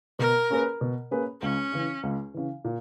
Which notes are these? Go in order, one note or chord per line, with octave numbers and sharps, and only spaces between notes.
B2 A#4
A#3 C#4 G#4 B4
B2
A#3 C#4 G#4 B4
C#2 C#4
C#3 E3
C#2
C#3 E3
A#2